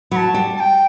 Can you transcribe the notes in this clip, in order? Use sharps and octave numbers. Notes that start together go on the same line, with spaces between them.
F#3 A5 B5
G3
A5
G5